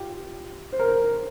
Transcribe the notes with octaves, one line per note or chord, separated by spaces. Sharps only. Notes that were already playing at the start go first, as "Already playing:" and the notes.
Already playing: F4 G4
C5
A#4